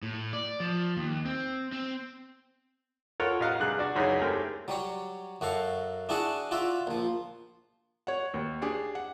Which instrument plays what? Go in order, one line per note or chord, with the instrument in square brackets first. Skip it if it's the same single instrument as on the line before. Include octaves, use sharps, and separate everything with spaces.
[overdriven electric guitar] A2
D5
F3
D#2
C4
C4
[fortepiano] F4 A4 A#4 C#5 F#5
A1 D#5 F5 F#5 A#5
G2 C3 G#4 F#6
D4 F#4 D5
C#2 F#2 D#4 E4 G#4
G#3 A3 C4 C#4 G4 A#4
[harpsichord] F#3 G3 C#5
F#2 F#4 A4 F5 C#6
D4 E4 F#4 G#4 A5 C#6
F4 F#4 D5 E5
A#1 F3
[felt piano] C#5 F#5
D#2
D4 G4 G#4
F#5